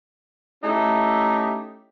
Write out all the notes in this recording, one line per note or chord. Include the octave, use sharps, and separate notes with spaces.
A3 C#4 D#4 E4 G4